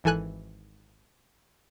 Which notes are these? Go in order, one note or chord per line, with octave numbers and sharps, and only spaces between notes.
G#1 E3 A4 G#5 F#6